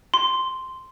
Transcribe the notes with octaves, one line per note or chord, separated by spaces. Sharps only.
C6